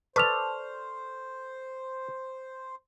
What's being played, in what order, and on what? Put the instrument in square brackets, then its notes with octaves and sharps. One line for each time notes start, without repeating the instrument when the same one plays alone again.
[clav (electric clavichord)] A4 D5 A5 [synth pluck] B4 [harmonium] C5 [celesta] C#6 F6 F7